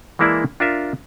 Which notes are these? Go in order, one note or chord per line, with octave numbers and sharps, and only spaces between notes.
E3 G#3 A#3 E4 D5 A5
D4 F4 A#4 E5